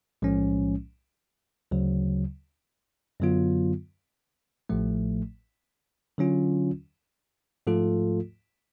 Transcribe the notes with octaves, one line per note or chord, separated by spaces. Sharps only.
B1 A2 F3 G#3 C#4
D2 C#3 F#3
F#2 D3 F#3 B3 F4
A1 A2 F3 A3
D3 F#3 C#4 F4
G#2 F3 A3 F4 A4